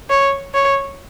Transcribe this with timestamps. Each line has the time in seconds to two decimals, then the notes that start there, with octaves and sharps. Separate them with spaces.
0.10 C#5
0.54 C#5